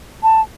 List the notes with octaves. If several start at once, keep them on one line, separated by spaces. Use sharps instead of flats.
A5